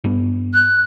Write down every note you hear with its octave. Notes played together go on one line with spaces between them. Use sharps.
G2 B3
F#6